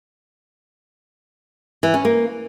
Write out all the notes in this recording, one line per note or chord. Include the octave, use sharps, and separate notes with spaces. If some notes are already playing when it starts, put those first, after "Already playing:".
E3
C#4
A#3